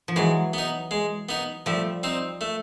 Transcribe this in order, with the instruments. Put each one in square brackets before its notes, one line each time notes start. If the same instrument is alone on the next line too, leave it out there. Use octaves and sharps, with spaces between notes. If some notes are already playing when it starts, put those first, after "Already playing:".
[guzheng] F3
[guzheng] E3 F#3 [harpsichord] G#3
[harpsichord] B3 D#4
G#3
B3 D#4
[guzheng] F3 G3 [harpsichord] A3
[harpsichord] C4 D#4
A3